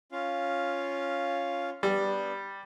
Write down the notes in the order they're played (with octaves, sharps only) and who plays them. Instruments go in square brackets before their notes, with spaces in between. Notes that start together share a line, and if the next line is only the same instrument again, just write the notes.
[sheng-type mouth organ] C#4 F4 F5
[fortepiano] G3 [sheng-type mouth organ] B3 D4